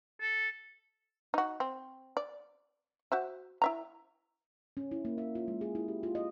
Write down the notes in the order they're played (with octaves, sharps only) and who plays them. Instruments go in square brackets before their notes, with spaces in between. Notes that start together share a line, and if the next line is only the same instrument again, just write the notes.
[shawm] A4
[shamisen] D#4 F#4
C4
D5
F#4 C5 E5
E4 E5 A#5
[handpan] C#4
E4
A#3
E5
F4
G#3
G#4
E4
G4
F4
D#5